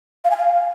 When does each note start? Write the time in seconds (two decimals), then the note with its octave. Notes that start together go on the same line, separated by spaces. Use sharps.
0.25 F5
0.31 G#5
0.37 F5